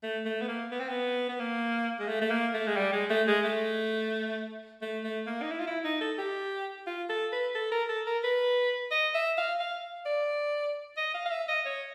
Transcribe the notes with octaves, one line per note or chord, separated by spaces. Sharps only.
A3
A3
B3
A#3
B3
C4
B3
B3
A#3
G#3
A3
A3
A#3
A3
G#3
G3
G#3
A3
G#3
A3
A3
A3
A#3
D#4
E4
F4
E4
D#4
A4
G4
F4
A4
B4
A4
A#4
A4
A#4
B4
D#5
E5
F5
F5
D5
D#5
F5
F5
E5
D#5
C#5